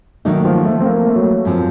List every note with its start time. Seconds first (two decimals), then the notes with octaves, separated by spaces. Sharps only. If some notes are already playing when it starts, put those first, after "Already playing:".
0.25 D#3 F#3 A3 A#3 D#4
0.45 F3
0.65 A3
0.80 C4
0.85 A#3
1.06 A3
1.16 F#3
1.45 F#2 F3 C4 F4